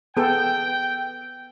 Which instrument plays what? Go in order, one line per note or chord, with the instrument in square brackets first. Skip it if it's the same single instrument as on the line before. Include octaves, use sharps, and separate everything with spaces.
[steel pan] B3 G#4 A4 [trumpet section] G5